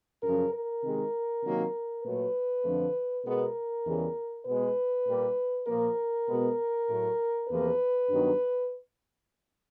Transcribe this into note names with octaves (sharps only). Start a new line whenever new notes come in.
F#2 C#3 F3 A#4
A#4
C3 D#3 G#3
C3 D#3 F#3 A#3
A#2 F#3 A3 B4
F2 D3 F3 A3
B2 G#3 B3 A#4
E2 C#3 E3 G3
B2 G#3 B3 B4
A#2 G3 A#3
A#2 F3 A#3 A#4
B2 G#3 B3
A2 F#3 A3
E2 C3 F3 A#3 B4
G2 D#3 F#3 B3